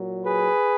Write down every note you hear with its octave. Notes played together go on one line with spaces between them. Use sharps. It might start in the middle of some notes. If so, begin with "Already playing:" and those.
Already playing: A#2 F#3
G#4 B4